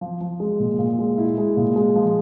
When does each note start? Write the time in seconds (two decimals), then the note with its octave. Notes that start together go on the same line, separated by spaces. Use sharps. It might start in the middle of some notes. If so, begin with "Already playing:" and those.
0.01 F3
0.21 F3
0.40 G#3
0.60 A#2
0.79 A#2
0.99 G#3
1.18 E4
1.38 G#3
1.57 A#2
1.76 G#3
1.95 F3